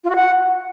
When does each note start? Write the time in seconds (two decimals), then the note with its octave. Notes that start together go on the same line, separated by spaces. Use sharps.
0.04 F4
0.10 F#4
0.16 F#5